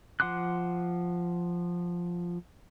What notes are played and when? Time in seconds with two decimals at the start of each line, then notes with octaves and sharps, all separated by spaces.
0.20 F3 F#5 C6 D6 F#6